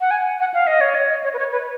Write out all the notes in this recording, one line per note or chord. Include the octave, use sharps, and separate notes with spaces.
F#5
G#5
F#5
F5
D#5
C#5
D#5
D#5
C#5
B4
C#5
B4